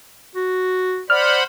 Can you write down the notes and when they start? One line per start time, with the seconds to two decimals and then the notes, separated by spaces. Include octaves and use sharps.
0.35 F#4
1.10 C5 D5 F#5 B5 F6